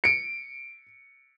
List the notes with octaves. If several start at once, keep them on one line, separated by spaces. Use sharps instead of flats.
C#7 D7